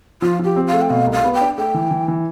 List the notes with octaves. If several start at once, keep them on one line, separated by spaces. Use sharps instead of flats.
F3 F4
F3
G4
C4
F5
A3
G5
B2 F5
C2
F5
B3
G5
D4
A3 G5
E3
E3
E3